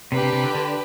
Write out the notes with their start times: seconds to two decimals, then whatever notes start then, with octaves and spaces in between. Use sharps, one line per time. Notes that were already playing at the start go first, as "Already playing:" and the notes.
0.11 C3 D4 G4 B4
0.22 C3
0.33 C3
0.44 D3
0.55 D3